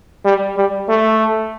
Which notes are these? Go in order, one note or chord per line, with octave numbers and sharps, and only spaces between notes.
G3
G3
A3